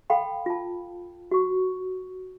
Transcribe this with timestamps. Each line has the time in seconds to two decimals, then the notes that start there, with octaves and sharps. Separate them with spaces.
0.10 A4 F5 G5 B5 C6
0.46 F4 A5
1.31 F#4 C#6